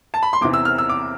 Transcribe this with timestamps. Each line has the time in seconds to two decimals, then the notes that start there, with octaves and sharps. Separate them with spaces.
0.14 A5
0.23 B5
0.33 C6
0.41 E2 C3 E3 D6
0.54 E6
0.65 F6
0.78 E6
0.89 D6